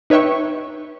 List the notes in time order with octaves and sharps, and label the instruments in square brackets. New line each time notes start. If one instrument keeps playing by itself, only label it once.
[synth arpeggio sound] D#4 B4 C#5 E5 G5 C#6